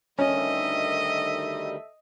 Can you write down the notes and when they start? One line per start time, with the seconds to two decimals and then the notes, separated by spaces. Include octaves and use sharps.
0.19 D2 D#3 G3 C#4 A4 D#5 E5